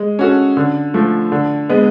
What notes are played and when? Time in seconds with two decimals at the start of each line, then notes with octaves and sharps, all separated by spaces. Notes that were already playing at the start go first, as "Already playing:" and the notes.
Already playing: G#3
0.19 C#4 F#4 A4
0.57 D3
0.94 F3 A3
1.32 D3
1.69 G#3 B3